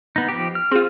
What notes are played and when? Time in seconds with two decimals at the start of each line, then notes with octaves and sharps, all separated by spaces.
0.16 B3 D#4
0.28 F3 G4
0.55 F6
0.71 C4 F4 G#4